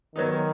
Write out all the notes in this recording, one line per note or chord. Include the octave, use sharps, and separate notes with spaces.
D#3 F#3 B3 D#4